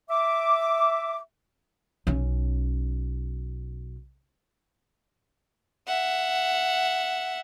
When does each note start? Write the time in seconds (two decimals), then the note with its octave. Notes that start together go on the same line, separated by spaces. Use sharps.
0.10 E5 D6
2.07 B1 C#4
5.87 E5 F#5